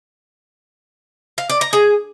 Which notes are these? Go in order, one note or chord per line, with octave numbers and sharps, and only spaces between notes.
F5
D5
A#5
G#4